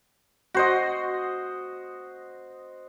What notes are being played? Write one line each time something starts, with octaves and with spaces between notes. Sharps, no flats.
F#4 C5 D#5